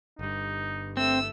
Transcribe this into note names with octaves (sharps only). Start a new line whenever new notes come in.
G1 G2 D#4
A3 C4 E6